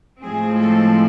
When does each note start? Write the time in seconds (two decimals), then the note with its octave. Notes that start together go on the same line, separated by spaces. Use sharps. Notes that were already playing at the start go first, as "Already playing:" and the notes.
0.22 A2 F3 G#3 C4 G#4
0.61 A4